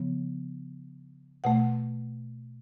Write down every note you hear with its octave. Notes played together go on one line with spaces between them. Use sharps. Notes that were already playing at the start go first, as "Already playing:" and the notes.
Already playing: C#3 F3 B3
B2 A3 F#5